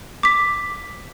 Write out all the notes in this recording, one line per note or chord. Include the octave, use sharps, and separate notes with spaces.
D6 B6